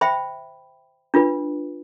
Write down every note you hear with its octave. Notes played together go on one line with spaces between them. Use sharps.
C5 E5 G5 B5
D4 F4 B4